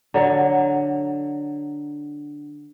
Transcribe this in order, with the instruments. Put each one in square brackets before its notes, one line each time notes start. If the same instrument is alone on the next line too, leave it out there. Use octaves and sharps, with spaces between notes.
[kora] D3 F#3